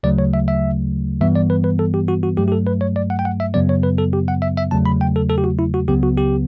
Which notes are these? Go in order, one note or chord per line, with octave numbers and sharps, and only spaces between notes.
D2 C#3 F#3 A3 D5
C#5
E5
E5
G2 E3 G3 B3 E5
D5
B4
B4
A4
G4
F#4
F#4
G2 F#3 A3 G4
G4
A4
B4
C#5
D5
F#5
G5
F#5
E5
F#2 C#3 F#3 B3 D5
C#5
B4
A4
G4
F#5
E5
E5
E2 C#3 F#3 A3 A5
B5
G5
A4
A4
G4
F#4
E4
F#4
C#2 C#3 F#3 B3 G4
F#4
G4